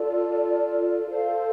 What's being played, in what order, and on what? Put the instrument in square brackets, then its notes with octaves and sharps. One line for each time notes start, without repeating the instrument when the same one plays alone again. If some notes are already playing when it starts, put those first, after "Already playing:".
Already playing: [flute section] F4 A4 D5
A4 C5 F5